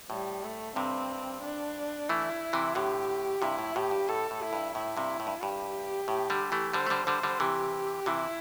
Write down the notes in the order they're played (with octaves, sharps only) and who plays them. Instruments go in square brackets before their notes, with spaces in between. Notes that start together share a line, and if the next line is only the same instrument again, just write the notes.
[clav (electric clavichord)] A2 [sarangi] G3
[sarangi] A3
[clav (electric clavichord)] G2 C3 [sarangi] C4
[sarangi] D4
[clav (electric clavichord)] E3 A3 [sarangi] E4
[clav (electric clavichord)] C3 E3
[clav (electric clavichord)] A2 D3 [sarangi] G4
[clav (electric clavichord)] G2 C3 [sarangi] E4
[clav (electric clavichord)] A2
[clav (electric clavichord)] A2 [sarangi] G4
[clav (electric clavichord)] G2
[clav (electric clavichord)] A2 [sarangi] A4
[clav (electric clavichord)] A2
[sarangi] E4
[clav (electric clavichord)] G2
[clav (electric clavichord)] A2 [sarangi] E4
[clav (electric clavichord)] G2 C3
A2
G2
[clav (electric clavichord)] G2 [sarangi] G4
[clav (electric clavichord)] A2
D3 G3
E3 A3
[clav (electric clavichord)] D3 G3 [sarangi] C5
[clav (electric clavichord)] A3
D3 G3
[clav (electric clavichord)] D3 G3 [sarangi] C5
[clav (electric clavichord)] D3 G3
[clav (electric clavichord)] C3 E3 [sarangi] G4
[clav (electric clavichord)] C3 E3 [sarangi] E4